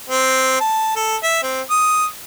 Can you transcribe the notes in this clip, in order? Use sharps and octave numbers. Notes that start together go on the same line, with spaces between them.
C4
A5
A4
E5
C4
D#6